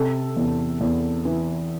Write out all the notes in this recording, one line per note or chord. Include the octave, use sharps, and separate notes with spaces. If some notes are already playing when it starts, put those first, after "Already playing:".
Already playing: C3 A4
E2
E2
E3